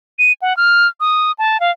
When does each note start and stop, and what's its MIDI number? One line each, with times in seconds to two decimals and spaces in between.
0.19 0.33 99
0.42 0.56 78
0.57 0.88 89
1.00 1.32 87
1.39 1.60 81
1.60 1.71 77